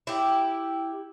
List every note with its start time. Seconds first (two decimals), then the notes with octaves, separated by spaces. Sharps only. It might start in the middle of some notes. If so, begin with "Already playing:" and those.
0.07 E4 G4